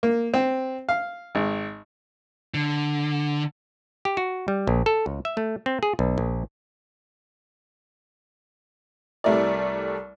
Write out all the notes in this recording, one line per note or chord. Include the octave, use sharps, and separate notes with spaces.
A#3
C4
F5
G#1
D3
G4
F#4
G3
A#1
A4
C#2
E5
A3
C4
G#4
B1
A#1
C2 G3 A3 E4 A#4 D5